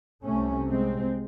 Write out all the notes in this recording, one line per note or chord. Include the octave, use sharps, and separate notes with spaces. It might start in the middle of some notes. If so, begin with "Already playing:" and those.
C2 C3 A3 C#4
G#3 C4